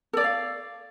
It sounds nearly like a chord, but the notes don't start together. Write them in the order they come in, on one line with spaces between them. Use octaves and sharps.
A4 D5 C#5 F5